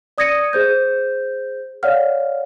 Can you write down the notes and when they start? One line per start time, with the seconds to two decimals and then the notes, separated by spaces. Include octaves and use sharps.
0.18 D5 D#6 G#6 A#6 C#7 D#7
0.53 G#4 C5 G6
1.83 C#5 D5 F5 F#5 F6